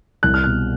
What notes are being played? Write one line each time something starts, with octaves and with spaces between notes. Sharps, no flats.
C2 F#6
F6
B2 F#6